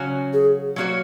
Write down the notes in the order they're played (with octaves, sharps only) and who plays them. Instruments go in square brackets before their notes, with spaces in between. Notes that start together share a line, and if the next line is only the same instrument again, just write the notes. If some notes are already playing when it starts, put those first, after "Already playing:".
Already playing: [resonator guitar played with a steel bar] C#3 F#3 C#4 F#4
[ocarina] G#4
[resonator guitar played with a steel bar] F#3 A#3 F#4 C#5